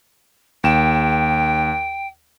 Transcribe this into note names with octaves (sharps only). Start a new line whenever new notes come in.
D#2 G5 E7